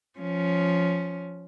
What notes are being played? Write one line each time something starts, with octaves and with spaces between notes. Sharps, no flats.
F3 C#4